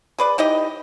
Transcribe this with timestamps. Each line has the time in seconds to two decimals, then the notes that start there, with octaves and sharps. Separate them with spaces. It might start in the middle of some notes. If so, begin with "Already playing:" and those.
0.18 G#4 B4 D5
0.38 E3 D#4 G4 D#5